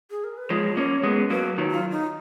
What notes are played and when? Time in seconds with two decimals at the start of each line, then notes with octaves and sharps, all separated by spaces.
0.11 G#4
0.24 A#4
0.37 B4
0.50 F3 G#3 C#5
0.77 A#3 C#4
1.03 G#3 B3
1.30 F#3 A#3 B4
1.58 D#3 F#3
1.71 F4
1.91 D#4